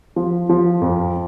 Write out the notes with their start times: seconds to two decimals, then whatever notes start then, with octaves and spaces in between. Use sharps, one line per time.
0.16 F3
0.49 F3
0.82 F2